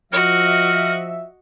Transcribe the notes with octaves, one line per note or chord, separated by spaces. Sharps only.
F3 F#4 D#5 E5 F6